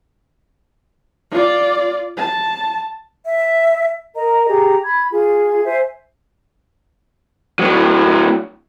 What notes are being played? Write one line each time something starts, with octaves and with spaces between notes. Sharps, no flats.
F4 D5
A5
E5
A#4 D#5 A#5
G4 G#4 A#5
B5 G#6
F4 G#4
C5 E5 G#5
A2 F#3